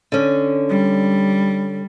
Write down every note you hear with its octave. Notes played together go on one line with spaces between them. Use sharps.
D3 C#4
G3